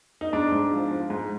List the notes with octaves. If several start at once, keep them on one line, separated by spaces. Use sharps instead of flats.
D#4
G#2 D4
G#2
F3
F3
G#2